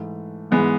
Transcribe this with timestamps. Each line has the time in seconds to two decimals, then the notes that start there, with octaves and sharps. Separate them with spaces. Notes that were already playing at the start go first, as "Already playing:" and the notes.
Already playing: G#2 E3 A3
0.51 G#2 E3 G#3 B3